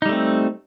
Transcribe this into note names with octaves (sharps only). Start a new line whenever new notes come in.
G3 A3 C4 D#4